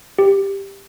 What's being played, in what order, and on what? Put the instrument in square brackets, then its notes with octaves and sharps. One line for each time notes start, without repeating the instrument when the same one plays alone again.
[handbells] G4